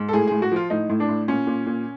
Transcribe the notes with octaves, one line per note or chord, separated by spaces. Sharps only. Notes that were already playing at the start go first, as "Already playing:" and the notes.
Already playing: G#2
A4
A2 G#4
A2 G#4
F#4
F3 F4
A2 D#4
A2
D4
A2
A#2 C#4
A#2
A#2